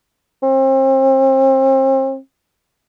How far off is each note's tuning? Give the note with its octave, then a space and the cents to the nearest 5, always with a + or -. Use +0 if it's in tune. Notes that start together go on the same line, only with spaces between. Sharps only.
C4 +35